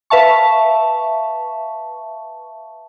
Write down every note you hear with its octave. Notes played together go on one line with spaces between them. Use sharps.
B4 E5 F5 A5 C#6